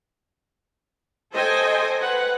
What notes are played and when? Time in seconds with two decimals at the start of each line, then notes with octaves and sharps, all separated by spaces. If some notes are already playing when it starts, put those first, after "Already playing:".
1.34 A4 C5 D#5 G5 G#5
2.01 B4 F#5